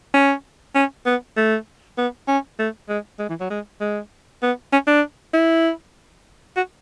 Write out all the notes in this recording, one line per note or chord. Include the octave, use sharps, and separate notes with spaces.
C#4
C#4
B3
A3
B3
C#4
A3
G#3
G#3
E3
F#3
G#3
G#3
B3
C#4
D4
E4
F#4